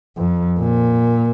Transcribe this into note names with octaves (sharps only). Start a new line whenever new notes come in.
F2
A#2